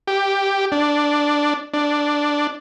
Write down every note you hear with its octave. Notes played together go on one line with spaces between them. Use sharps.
G4
D4
D4